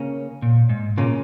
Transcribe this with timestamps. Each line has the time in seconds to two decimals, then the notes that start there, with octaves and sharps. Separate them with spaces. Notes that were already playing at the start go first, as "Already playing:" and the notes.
Already playing: C#3 A#3 C#4
0.42 A#2
0.69 G#2
0.97 A#2 C#3 A#3 C#4